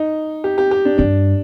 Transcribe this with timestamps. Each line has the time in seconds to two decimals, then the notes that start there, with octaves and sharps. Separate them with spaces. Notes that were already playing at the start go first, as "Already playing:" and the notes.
Already playing: D#4
0.44 G4
0.58 G4
0.71 G4
0.85 D4
0.98 G2 D4